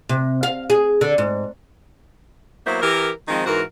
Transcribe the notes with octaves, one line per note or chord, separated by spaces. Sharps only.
C3
F5
G#4
D3
G#2
F#3 A#3 B3 E4 C5
E3 G4 A#4
D#3 F3 G#3 C4 D#4
G#2 E3 F#4 A#4